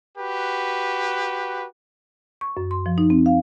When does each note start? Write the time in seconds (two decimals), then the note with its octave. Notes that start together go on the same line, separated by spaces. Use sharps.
0.18 F#4 G4 B4
2.41 C#6
2.57 F#2
2.71 C6
2.86 F3
2.98 D#4
3.10 C4
3.26 F5